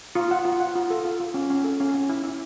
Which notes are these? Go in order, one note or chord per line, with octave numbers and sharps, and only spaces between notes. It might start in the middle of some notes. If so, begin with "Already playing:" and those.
F4
F#5
F4
F#5
F4
A4
F4
F4
C#4
C#4
A4
C#4
C#4
E4
E4